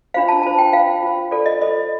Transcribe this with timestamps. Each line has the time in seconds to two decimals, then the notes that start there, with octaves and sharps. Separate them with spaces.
0.14 D4 F4 C5 F5
0.28 A5
0.43 D4 F4 C5 A5
0.58 G5
0.73 F4 C5 F5
1.03 F4 C5
1.31 F4 A4 C5 D5
1.46 D#5
1.61 F4 A4 C5 D#5